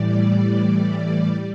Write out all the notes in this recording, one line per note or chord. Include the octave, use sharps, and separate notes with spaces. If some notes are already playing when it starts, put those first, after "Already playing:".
Already playing: A2 E3 G3 D5
G3